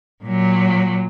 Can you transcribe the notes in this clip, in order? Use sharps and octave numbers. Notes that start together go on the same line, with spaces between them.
A#2 F#3